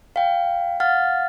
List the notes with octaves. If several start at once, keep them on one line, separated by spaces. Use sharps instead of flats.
F5 G5
F5 F#5 F6 A6